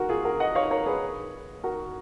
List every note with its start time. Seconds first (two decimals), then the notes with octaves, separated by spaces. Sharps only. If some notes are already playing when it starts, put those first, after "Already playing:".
Already playing: F#4 A#4
0.09 F4 G#4
0.25 F#4 A#4
0.40 D#5 F#5
0.55 C#5 F5
0.71 A#4 C#5
0.86 G#4 B4
1.64 F#4 A#4